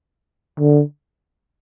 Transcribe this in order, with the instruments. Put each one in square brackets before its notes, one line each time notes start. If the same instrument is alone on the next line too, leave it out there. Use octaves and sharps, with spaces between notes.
[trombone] D3